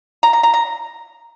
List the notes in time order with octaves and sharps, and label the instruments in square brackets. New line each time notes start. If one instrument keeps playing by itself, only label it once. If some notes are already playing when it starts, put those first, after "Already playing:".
[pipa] A#5
A#5
A#5
A#5